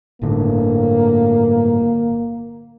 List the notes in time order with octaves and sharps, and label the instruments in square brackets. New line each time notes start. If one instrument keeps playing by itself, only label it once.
[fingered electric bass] G1 A2 D3 [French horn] A#3